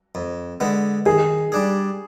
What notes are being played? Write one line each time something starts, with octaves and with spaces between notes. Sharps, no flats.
F2
D3 G#3 B3
D#3 G#4
G3 D4 G#4